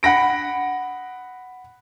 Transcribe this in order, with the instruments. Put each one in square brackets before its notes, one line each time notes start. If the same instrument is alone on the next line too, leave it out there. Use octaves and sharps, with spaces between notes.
[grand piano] F#5 B5 A#6 D7